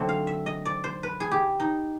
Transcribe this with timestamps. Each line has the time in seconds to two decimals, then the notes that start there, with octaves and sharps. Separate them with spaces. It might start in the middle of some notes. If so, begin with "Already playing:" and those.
Already playing: D3 F#3 A3 C4
0.09 F5
0.27 E5
0.46 D#5
0.65 D5
0.84 C5
1.03 B4
1.20 G#4
1.31 G4
1.60 D#4